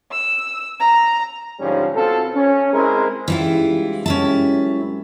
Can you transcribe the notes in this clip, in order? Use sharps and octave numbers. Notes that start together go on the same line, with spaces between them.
E6
A#5
G#2 D3 F3 G3 C#4
B2 C4 F4 A4
C#4
G#3 C4 E4 G#4 A#4
G#2 C#3 E3 G3 E4 F4
F#2 C3 G#3 C#4 E4 A5